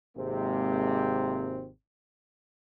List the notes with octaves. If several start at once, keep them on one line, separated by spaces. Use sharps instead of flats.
G#1 G#2 C3 G#3 A#3 C4